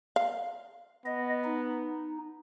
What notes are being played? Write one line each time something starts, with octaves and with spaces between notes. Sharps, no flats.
F5
B3 D#5
D#4